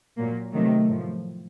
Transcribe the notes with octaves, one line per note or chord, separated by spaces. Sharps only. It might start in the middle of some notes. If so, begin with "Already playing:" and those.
A#2 F#3 A#3
C3 D#3 F#3 A3
A2 F3